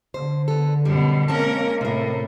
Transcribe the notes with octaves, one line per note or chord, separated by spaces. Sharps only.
D3 C5
B3 A4
F#2 B2 G3
G#3 A#3 C4 C#4 A#4 A5
A2 C3 A#4